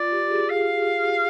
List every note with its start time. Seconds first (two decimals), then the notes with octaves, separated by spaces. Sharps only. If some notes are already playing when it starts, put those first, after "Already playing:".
Already playing: F4 D5
0.12 G4
0.27 G4
0.31 G#4
0.49 G#4 F5